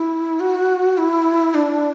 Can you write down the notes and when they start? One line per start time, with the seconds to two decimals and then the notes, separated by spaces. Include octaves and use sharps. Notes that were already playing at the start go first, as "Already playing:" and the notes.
Already playing: E4
0.40 F#4
0.98 E4
1.54 D4